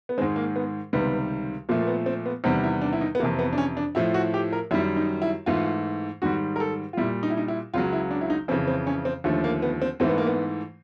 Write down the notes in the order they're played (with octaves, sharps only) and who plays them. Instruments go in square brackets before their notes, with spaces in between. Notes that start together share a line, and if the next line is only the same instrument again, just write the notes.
[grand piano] B3
G#2 D#3 G#3 C4
A#3
B3
C#2 C3 D#3 G3 B3
A#2 F3 A3 A#3
A#3
B3
C4
B3
E2 C3 D#3 G3 C4
E4
D4
E4
D#4
B3
F2 C3 E3 A#3
B3
D4
C#4
D4
A2 F3 A3 E4
F#4
G4
A#4
F#2 D#3 G3 E4
D#4
E4
G#2 E3 A3 F4
G#2 D#3 G3 F#4
A#4
A4
F4
A#2 G3 E4
D#4
E4
D#4
E4
C#2 C#3 F#3 F4
E4
D4
E4
D#4
F2 C4
C#3 E3
C4
C#4
C4
D#2 D3 F3 A3
A#3
B3
C4
G#2 E3 A3 C4
B3
A#3
B3